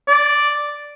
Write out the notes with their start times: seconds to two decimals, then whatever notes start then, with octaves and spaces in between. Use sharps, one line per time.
0.08 D5